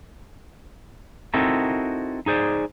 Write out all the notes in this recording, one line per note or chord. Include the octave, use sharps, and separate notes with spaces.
C4 D#4 E4 F#4 A4 A#4
D#4 G#4 C5 D5